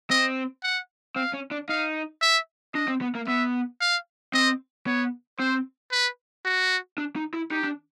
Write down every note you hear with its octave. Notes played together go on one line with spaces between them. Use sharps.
C4 D#5
F#5
C4 F5
C#4
D4
D#4 F5
E5
D4 D#5
C4
B3
A#3
B3 E5
F5
C4 D#5
B3 C#5
C4 C5
B4
F#4
D4
D#4
E4
D#4 G4
D4